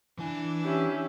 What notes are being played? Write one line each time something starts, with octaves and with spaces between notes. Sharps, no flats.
E3 D4 E4 G#5
C#4 G4 E5